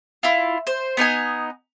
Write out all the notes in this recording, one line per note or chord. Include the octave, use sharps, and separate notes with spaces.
E4 F4
C5
B3 D#4 D#5 G#5